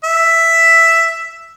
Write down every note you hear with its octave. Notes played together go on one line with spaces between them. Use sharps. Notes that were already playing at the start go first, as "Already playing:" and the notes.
E5